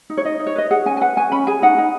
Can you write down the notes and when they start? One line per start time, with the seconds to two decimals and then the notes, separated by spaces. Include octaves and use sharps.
0.10 D#4
0.17 C#5
0.25 D#4 D#5
0.40 D#4
0.47 C#5
0.56 B4 D#5
0.71 G#4 F#5
0.86 C#4 G#5
0.97 G#5
1.01 B4 F#5
1.17 C#4 G#5
1.32 C#4 B5
1.47 G#4 G#5
1.62 D#4 F#5
1.78 D#4